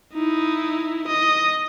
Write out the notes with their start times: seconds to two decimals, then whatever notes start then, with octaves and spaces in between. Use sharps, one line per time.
0.13 D#4 E4
1.08 D#5